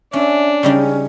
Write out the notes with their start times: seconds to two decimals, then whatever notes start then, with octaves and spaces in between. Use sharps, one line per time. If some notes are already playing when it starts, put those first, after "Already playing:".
0.13 C#4 D4 E5
0.63 C#3 G3 C#4 D#4